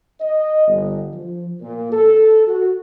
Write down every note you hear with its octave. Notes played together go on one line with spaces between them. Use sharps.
D#5
G1
F3
A#2
A4
F#4